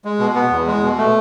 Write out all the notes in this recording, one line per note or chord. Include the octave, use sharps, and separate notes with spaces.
G#3
B2
B3
E2
G#3
B2
A3